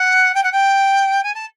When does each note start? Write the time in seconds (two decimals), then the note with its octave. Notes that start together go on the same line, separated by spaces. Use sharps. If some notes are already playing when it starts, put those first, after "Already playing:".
Already playing: F#5
0.34 G5
0.43 F#5
0.52 G5
1.23 G#5
1.34 A5